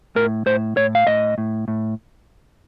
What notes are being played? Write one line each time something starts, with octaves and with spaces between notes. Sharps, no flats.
A2 A#4
A2 C5
A2 C#5
F5
A2 D#5
A2
A2